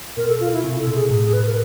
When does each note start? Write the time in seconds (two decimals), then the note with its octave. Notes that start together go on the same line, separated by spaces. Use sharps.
0.17 B2 A#4
0.29 A4
0.40 F4
0.53 E4
0.64 C3
0.79 A4
0.87 B2
0.95 G#4
1.10 A2 G#4
1.23 G#4
1.33 B4
1.46 A#4